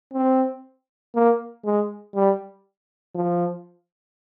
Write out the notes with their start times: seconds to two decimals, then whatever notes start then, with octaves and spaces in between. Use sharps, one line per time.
0.13 C4
1.15 A#3
1.65 G#3
2.15 G3
3.15 F3